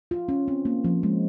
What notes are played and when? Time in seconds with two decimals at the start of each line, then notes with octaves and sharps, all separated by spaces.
0.11 F4
0.29 C#4
0.48 C4
0.65 A#3
0.84 F3
1.03 G#3